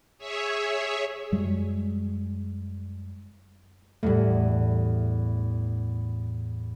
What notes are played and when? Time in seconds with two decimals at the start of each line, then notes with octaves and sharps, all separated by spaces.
0.18 G#4 C#5 E5
1.32 F#2 G3 G#3
4.03 E2 A2 G3 A3